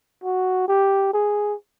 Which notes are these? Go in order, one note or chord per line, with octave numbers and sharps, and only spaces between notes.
F#4
G4
G#4